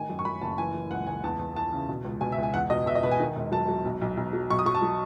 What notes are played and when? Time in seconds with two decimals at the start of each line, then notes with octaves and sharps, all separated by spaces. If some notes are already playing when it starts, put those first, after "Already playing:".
Already playing: A1 D#3 G#5
0.09 F#2
0.19 C#6
0.25 F#2 B5
0.42 F#1 A5
0.58 E3 G#5
0.74 E3
0.91 C#2 F#5
1.07 C#2 G#5
1.24 E2 A5
1.39 E2
1.56 E3 A5
1.72 C#3
1.89 B2
2.04 C#2
2.21 B2 G#5
2.32 E5
2.38 C#2
2.43 G#5
2.54 E2 F#5
2.70 B2 D#5
2.86 B2 E5
2.95 D#5
3.03 B2 B4
3.11 G#5
3.20 D#3
3.36 E1
3.52 F#3 A5
3.68 F#3
3.85 B1
4.01 B1
4.17 B1
4.33 F#3
4.50 B1 C#6
4.59 D#6
4.66 F#3 C#6
4.75 A5
4.82 F#3